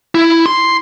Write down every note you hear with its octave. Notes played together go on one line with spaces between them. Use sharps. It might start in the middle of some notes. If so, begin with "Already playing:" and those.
E4
C6